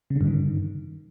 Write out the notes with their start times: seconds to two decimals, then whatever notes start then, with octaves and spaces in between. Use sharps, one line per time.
0.10 C#3
0.16 D3
0.21 G2
0.26 D#3